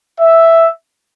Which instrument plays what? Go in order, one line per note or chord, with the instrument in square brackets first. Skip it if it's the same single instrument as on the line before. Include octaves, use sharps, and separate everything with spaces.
[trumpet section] E5